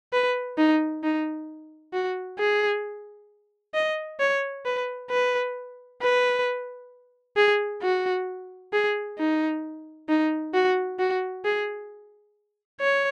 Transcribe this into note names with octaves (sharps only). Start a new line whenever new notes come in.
B4
D#4
D#4
F#4
G#4
D#5
C#5
B4
B4
B4
G#4
F#4
G#4
D#4
D#4
F#4
F#4
G#4
C#5